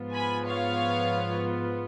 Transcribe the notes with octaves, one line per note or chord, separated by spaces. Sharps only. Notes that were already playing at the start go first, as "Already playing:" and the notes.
Already playing: G#2 F3 B3 F4
G#5 B5
C#5 F5